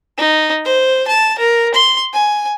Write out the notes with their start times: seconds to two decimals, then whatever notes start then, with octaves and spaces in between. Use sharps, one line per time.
0.18 D#4
0.65 C5
1.08 A5
1.39 A#4
1.74 C6
2.13 G#5